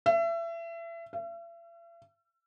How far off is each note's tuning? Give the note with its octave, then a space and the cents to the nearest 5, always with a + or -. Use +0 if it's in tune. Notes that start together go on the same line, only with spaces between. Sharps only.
E5 +30
E5 +45